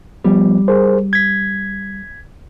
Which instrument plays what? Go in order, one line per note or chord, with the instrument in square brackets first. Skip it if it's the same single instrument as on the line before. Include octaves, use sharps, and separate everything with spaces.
[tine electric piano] F3 B3 [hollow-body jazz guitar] G3
[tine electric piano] G#4 A#4 C5
G#6 B6